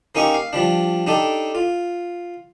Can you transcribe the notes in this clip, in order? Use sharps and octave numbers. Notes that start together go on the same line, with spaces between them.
A#3 C#4 D#4 G4 C#6 D#6
F5
F3 G3 D4
D4 D#4 G4 A4
F4